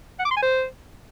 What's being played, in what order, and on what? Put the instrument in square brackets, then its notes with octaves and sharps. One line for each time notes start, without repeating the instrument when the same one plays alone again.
[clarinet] F#5
D6
C6
G#5
C5